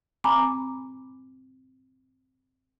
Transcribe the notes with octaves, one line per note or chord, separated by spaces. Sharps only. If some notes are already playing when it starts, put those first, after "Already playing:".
C4 G#5 A#5 B5 D6